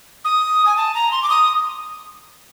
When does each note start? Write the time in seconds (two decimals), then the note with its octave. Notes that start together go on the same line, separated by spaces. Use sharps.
0.25 D#6
0.66 G#5
0.77 A5
0.95 A#5
1.12 C6
1.23 D6
1.30 D#6